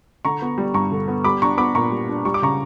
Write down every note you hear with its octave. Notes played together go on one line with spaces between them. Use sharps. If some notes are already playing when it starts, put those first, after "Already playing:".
D3 A#5 C#6
B3
G3
G2 A#5 C#6
D3
B3
G3 B5 D6
D4 A#5 C#6
B3 B5 D6
A#2 A#5 C#6
G3
D4
G3 C#6
D6
C#3 A#5 C#6